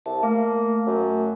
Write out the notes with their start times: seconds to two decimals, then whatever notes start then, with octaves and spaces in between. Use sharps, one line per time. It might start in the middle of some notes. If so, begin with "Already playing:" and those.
0.06 C2 E5 A5
0.23 A3 A#3
0.87 F#2